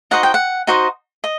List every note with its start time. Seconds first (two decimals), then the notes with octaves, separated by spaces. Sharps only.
0.11 D#4 F#4 C5 D#5 F#5
0.23 G5
0.34 F#5
0.67 D#4 F#4 C5 D#5
1.24 D#5